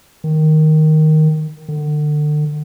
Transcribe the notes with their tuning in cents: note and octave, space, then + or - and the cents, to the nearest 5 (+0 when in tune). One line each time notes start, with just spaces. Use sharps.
D#3 +0
D3 +35